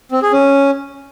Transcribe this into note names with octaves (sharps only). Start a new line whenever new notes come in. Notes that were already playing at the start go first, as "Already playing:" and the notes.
C4
G#4
C#4